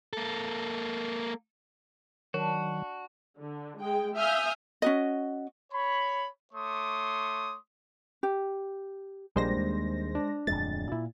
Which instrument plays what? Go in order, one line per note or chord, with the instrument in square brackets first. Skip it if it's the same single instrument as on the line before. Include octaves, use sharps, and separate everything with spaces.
[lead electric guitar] A#3 A4
[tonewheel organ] D#3 F#3 [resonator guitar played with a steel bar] D4 [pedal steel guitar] F#4
[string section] D3
G#3 G5
E5 F5 G#5 D#6 F6 G6
[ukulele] C#4 F#4 D#5
[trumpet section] C#5 B5
A3 C#5 C6 D6 D#6
[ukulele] G4
[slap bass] A#1 F3 [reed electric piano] G3 A#3 D4 [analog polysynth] G#3 C5 A#6
[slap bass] D#2
[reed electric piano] D4
[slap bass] D1 F2 G#3 [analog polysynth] A6
[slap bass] A#2 [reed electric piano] E4